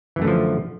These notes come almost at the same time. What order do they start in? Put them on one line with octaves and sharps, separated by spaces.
E3 F#2 A3 D3 F3